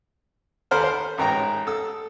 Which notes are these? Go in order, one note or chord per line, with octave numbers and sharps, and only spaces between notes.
D#2 A4 A#4 C5 B5 F6
C5
A1 G#2 A#4 C#5 G5 A#5
A4 D#6 E6